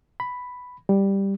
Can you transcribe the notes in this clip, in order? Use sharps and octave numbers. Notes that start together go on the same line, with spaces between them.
B5
G3